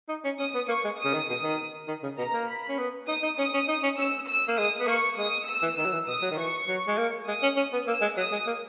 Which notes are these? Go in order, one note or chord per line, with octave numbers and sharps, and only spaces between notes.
D#4
C#4
C#4 D#6
B3
A#3 C#6
G#3
D#6
C#3
D#3
B2
D#3
D#3
C#3
B2 A#5
A#3
B5
C#4
B3
D#4 D#6
D#4
C#4 D#6
C#4
D#4
C#4
C#4 E6
E6
A#3
G#3 D#6
B3
A#3 C#6
G#3 D#6
E6
E3
D#3
F#3
E3
B2 D#6
F#3
D#3
E3 C#6
F#3
G#3
A#3
G#3 D#6
C#4
C#4
B3
A#3 E6
G#3
F#3 D#6
G#3
A#3